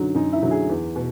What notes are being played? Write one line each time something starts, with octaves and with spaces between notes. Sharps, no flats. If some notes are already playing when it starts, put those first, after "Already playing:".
Already playing: F#2 D3 F#3 D#4
F#2 D#4
E4
D3 F#3
G#4
E2
B2